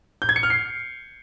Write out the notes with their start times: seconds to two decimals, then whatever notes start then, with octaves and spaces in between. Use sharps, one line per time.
0.22 G6
0.29 G#6
0.36 C#7
0.43 F6
0.50 C7